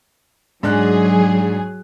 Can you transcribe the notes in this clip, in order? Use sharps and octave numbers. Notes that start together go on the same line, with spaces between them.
G#2 F#3 D4 G#4 F#6